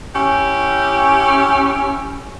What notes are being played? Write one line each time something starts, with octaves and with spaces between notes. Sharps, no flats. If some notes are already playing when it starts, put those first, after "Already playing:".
C#4 E4 G4